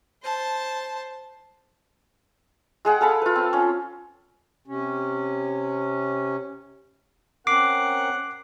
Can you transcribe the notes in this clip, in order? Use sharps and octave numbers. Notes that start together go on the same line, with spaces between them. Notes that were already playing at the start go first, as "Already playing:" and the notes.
C5 A5
G#3 G#4 F#5 G5
A4 F5 A5 B5
F4 B4
C4
C#4
C3 C#4
C4 C#4 A#4 F#5 D6 C7